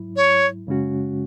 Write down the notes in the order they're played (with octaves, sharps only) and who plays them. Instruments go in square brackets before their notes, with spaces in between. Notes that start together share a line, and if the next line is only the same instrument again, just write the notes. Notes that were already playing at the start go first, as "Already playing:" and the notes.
Already playing: [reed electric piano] G#2 F#3 E4
[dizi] C#5
[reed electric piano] F#2 C#3 G#3 C#4 F#4